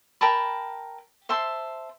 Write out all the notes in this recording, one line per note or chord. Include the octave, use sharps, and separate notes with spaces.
A#4 G5 A5 B5
C5 E5 A5 C6